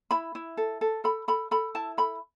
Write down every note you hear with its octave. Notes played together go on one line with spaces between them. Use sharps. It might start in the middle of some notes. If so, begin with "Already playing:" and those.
E4 B5
E4
A4
A4
A4 B5
A4 B5
A4 B5
E4 A5
A4 B5